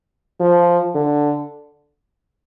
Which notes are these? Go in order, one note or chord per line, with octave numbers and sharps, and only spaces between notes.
F3
D3